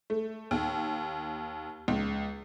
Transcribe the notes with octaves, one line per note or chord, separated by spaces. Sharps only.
A3
D#2
C#2